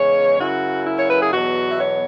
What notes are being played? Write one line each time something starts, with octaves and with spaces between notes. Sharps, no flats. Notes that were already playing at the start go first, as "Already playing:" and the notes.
Already playing: E2 C#3 G#3 C#5
F#2 C#3 F#3 C#4 E4 F#4
E4
C#5
B4
G#4
E2 B2 F#3 B3 F#4
E5
C#5